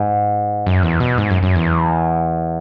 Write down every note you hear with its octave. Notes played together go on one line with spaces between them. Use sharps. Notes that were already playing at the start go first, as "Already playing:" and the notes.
Already playing: G#2
F#2
E2
B2
G#2
F#2
F#2
E2